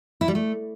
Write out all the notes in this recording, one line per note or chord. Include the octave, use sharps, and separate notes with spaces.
E4
G3
A3